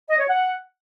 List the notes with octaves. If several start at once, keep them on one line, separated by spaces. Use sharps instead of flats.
D#5
C#5
F#5